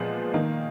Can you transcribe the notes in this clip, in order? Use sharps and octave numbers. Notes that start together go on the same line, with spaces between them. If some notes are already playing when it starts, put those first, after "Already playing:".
Already playing: A#2 F3 G#3 B3
D#3 A#3 D#4